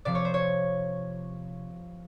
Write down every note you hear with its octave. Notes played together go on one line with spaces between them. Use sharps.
C3 F3 D5
C#5
C5
C#5